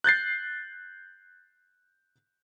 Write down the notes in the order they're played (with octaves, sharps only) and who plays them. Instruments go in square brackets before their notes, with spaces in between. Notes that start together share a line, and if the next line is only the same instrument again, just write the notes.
[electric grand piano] F#6 G6 A6 C7